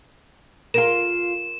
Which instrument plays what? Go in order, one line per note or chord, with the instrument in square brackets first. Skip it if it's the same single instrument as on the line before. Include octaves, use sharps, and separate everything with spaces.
[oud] F4 G#4 A#4 [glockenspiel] E7